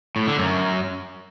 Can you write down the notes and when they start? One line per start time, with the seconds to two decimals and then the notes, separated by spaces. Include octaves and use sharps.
0.16 A2
0.27 D3
0.39 F#2